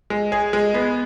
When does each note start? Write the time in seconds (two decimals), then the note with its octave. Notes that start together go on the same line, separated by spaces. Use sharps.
0.10 G#3
0.32 G#4
0.53 G#3
0.74 B3